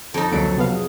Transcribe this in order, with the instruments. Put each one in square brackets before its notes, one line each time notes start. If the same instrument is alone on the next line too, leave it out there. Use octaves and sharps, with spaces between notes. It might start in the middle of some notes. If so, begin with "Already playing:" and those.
[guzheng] F2 D#4 [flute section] A4
[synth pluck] C#2 D3 D7 [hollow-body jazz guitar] A#2 F#3
[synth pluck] C3 B3 F5
[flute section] G#4